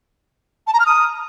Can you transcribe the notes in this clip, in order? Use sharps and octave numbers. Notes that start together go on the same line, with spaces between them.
A5
A#5
F6
D#6